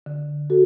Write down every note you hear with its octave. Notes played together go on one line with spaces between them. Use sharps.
D3
F#4 A4